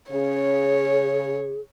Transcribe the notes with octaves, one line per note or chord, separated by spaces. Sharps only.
C#3 G#4 C#5